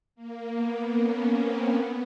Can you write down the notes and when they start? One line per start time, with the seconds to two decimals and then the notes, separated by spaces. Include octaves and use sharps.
0.15 A#3
0.54 B3
0.95 C#4
1.34 C4
1.74 B3